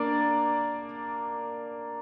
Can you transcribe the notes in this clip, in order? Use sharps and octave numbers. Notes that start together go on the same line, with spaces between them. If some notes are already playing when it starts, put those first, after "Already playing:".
Already playing: A#3 D4 D5